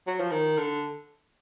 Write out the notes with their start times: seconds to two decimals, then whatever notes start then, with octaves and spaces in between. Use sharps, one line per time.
0.07 F#3
0.20 F3
0.31 D#3
0.58 D3